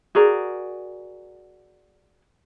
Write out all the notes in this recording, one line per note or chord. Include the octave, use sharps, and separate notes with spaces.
F#4 G#4 A#4 D5